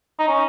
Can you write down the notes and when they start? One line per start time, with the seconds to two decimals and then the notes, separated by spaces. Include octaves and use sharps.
0.19 D#4
0.28 C#4